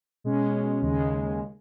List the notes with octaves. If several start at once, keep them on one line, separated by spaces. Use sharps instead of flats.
B2 G#3 C#4
D#2 C#3 G#3